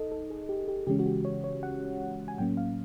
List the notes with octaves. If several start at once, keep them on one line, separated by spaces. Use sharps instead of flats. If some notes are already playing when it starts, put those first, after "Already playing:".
Already playing: D#4 A4 D#5
A4
G#4
G4
G4
C#3 E3 G#3 C#4 G4
F#4
G4
C#5
C#5
F#5
G#5
A2 F#3 A#3 C#4 G5
F5